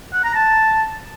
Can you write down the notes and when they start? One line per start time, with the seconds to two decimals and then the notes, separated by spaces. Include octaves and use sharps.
0.13 F#5
0.24 A#5
0.35 A5